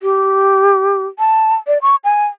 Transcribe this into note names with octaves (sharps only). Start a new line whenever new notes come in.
G4
A5
D5
C#6
G#5